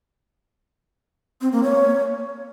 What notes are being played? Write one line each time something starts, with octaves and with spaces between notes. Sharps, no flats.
C4
A#3
C#5